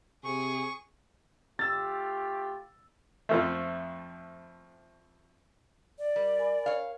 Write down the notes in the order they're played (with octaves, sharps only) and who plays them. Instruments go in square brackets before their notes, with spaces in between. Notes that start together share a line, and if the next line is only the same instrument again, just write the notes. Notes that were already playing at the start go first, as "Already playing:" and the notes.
[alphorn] C3 [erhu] G#4 [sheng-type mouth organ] C#6
[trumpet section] A3 F4 G4 [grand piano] E6 A6
[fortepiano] F2 F3 A3
[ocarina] D5
[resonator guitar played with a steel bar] G3 [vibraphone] A#4
[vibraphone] A#4 G#5 B5
[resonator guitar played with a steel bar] C#5 F5